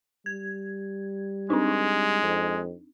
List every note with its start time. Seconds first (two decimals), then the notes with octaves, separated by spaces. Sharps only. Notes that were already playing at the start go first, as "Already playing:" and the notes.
0.26 G3 G#6
1.50 G#3 C4 D4 D#4
2.22 F2